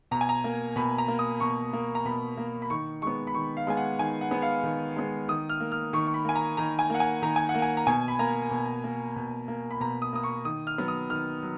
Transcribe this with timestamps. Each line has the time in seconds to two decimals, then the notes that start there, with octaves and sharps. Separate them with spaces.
0.11 B2 A#5
0.21 G#5
0.29 A#5
0.44 A#3
0.76 B2 B5
0.98 A#5
1.08 A#3
1.19 D#6
1.40 B2 C#6
1.73 A#3
1.95 A#5
2.05 B2 B5
2.37 A#3
2.62 B5
2.70 D#3 C#6
3.02 G#3 B3 C#6
3.27 B5
3.34 D#3 C#6
3.57 F5
3.67 G#3 B3 G#5
3.77 F#5
3.99 D#3 G#5
4.21 F#5
4.31 G#3 B3
4.42 F5
4.63 D#3
4.96 G#3 B3
5.28 D#3 D#6
5.49 F6
5.60 A#3
5.72 F6
5.93 D#3 C#6
6.07 C#6
6.14 B5
6.25 A#3 G#5
6.35 A#5
6.57 D#3 A#5
6.79 G#5
6.90 A#3 F#5
7.00 G#5
7.22 D#3 A#5
7.36 G#5
7.49 F#5
7.55 A#3
7.62 G#5
7.77 A#5
7.87 B2 G#5
8.08 B5
8.19 A#3 A#5
8.51 B2
8.84 A#3
9.16 B2
9.48 A#3
9.71 B5
9.80 B2 A#5
10.02 D#6
10.13 A#3 D#6
10.23 C#6
10.45 D#3 D#6
10.67 F6
10.78 F#3 B3
10.88 D#6
11.10 D#3 F6
11.43 F#3